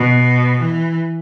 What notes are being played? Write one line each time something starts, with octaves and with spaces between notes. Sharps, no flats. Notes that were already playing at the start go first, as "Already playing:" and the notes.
Already playing: B2
E3